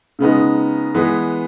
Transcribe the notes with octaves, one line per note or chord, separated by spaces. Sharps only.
C#3 G#3 B3 D#4
E3 G#3 B3